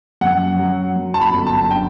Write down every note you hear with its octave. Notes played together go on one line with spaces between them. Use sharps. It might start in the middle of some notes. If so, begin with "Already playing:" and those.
F#2 F#5
F#3
F#2
A5
B5
G1
A5
D3 G5